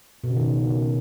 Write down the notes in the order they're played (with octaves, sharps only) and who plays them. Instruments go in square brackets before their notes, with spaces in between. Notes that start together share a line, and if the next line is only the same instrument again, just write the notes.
[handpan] B2
C#3
D#3